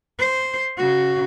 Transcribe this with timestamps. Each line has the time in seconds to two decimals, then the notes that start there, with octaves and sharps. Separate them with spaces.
0.19 C5
0.77 C#3 F#4